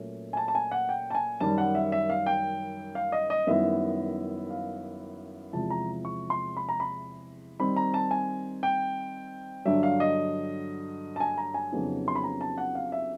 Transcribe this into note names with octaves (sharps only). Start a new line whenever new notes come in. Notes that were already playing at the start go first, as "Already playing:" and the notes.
Already playing: A#2 F#3 A3 C#4
G#5
A5
A5
G#5
F#5
G5
A5
G#5
F#2 D#3 G3 A5
F#5
E5
E5
F5
G5
F5
D#5
D#5
F#2 D#3 G3 B3 E4 E5
F5
E2 C3 F3 G#3 A5
A#5
C#6
C6
B5
A#5
B5
D#3 G3 C4 D#4 B5
A#5
A5
G#5
G5
G2 D3 F#3 E5
F5
D#5
A5
G#5
A#5
G#5
F2 C#3 F#3 B3 D#4
C6
B5
A#5
A5
F#5
F5
E5